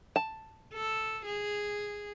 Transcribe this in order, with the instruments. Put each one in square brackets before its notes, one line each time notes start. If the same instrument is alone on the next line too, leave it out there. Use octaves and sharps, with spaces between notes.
[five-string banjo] A5
[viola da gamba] A4
G#4